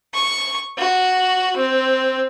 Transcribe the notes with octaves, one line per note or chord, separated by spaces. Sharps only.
C#6
F#4
C4